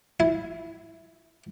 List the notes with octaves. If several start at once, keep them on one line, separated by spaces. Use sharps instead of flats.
E4